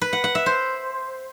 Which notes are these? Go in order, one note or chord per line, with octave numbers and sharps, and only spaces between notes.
B4
F#5
F#5
E5
C5